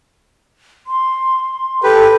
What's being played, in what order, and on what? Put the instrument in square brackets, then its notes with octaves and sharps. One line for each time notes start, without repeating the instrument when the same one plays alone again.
[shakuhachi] C6
[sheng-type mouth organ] G4 B4 [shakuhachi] A4